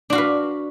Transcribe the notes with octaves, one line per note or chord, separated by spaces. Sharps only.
D4 F#4 B4 F5